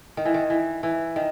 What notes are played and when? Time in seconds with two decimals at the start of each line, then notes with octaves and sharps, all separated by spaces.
0.17 D#3
0.25 E3
0.34 D#3
0.50 E3
0.83 E3
1.16 D#3